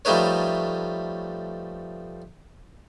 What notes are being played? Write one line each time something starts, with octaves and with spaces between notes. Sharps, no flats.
F3 G3 A3 D#4 B4 C#5